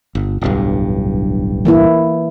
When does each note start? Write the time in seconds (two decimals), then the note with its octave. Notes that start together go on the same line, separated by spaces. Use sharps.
0.15 G1
0.42 D1 B1 G2
1.65 E3 A#3 E4